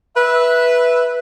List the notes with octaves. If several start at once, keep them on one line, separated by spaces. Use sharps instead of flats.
B4 E5